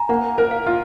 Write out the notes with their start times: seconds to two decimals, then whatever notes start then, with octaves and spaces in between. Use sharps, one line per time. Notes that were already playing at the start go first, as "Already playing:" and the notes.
Already playing: G#5 A#5
0.09 A#3 F#5
0.38 A#4
0.51 F5
0.66 F4